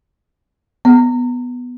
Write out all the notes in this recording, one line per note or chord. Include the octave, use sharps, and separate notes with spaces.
B3